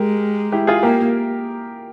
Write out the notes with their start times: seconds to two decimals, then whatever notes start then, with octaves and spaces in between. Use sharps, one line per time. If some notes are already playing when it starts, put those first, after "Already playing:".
Already playing: G#3 G4 A#4
0.52 E4 G4
0.67 F4 G#4
0.83 A#3 G4 A#4